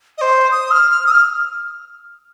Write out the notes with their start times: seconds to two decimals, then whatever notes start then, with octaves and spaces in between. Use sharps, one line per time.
0.18 D#5
0.22 C5
0.51 D#6
0.71 F6
0.91 F6
1.06 D#6
1.11 F6